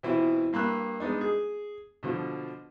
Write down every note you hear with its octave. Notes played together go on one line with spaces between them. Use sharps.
B2 E3 B3 C4 E4 F4
G2 A#3 B5 E6 F#6
G#3 B3 D4 D#4
G#4
B2 D3 F3